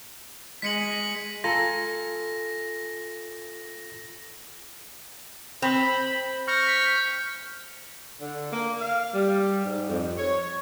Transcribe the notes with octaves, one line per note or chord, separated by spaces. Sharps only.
G#3 B6 C#7 F#7
F4 A4 G#5 A#5 A#6
C4 B5
C#6 F6 G6 A#6
B6
D3
A#3
F5
G3
G#2
F2
C#5